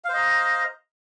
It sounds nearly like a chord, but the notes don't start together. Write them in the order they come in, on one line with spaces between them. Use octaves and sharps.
F5 C5 D#5 A#5